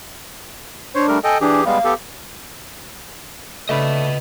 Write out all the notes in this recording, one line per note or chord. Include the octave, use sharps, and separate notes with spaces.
D4 C5 C#5
G3 A3 A#4
A4 D#5 G5 G#5
E3 D4 G4 G#4
G3 G#3 B3 F5
B3 G4 A4
C#3 A3 D4 B4 D#5 B5